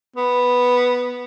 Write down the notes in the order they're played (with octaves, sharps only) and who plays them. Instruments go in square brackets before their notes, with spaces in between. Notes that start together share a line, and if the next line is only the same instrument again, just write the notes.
[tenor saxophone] B3